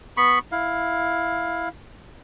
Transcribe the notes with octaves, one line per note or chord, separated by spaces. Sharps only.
B3 B5 C#6
E4 F5